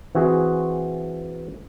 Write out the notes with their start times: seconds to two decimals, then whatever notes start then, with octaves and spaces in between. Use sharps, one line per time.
0.15 E3 C4 F#4 G#4